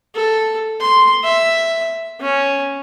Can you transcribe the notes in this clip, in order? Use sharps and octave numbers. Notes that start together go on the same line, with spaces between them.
A4
C6
E5
C#4